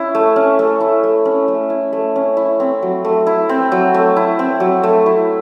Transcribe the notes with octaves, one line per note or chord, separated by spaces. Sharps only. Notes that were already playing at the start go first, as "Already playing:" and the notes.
Already playing: C#4 E4
A3
C#4
A3
E4
A3
C#4
A3
E4
A3
C#4
E4
C4
F#3
A3
E4
C4
F#3
A3
E4
C4
F#3
A3
E4